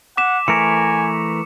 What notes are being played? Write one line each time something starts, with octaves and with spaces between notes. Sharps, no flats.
F#5 D6 B6 E7
E3 A3 A#4 G#5 C#7